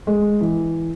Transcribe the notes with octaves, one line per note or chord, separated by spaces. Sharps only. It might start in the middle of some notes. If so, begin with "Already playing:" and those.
G#3
E3